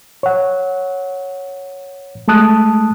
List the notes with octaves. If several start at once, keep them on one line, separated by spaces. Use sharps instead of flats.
C#5 F#5
G#3 A3 A5 D#6 F#6